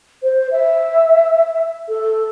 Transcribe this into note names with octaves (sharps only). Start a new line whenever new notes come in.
C5
E5
A4